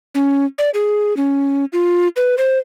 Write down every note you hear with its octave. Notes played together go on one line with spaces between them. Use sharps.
C#4
D5
G#4
C#4
F4
B4
C5